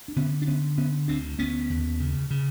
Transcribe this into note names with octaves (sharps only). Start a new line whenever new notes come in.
D4
D3 B3 C#4
D4
D3 B3 C#4
D3 B3 C#4
D2 C4 D4
D2 B3 C#4
D#2
C#3
C#3